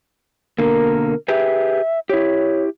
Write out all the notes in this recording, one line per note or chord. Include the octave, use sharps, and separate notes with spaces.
B2 D3 A#3 A#4
G4 G#4 B4 E5
E4 G4 C#5